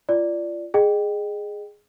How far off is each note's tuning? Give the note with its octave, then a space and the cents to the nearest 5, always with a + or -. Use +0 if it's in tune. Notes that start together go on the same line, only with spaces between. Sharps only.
F4 -25 D5 +0
G#4 +0 D#5 -30 G5 +0